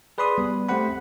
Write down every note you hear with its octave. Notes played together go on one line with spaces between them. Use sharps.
G#4 B4 D5 B5 C6 D#6
G3 B3
A3 C4 G4 C5 F#5 B5